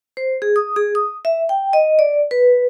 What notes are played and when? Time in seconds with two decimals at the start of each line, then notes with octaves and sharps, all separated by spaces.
0.17 C5
0.42 G#4
0.56 D#6
0.76 G#4
0.95 D#6
1.25 E5
1.49 G5
1.73 D#5
1.99 D5
2.31 B4